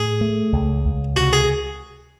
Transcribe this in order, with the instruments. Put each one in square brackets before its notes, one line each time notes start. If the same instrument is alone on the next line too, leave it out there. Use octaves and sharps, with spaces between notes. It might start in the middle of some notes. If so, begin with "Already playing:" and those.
Already playing: [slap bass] A2 [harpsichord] G#4
[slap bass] A3
C#2
C#2
[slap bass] C3 [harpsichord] F#4
[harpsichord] G#4